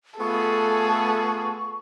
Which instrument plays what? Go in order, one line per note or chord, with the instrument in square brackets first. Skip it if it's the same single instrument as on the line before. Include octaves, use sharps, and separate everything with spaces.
[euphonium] A3 [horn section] B3 F4 G#4 [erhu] A4 [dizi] C#6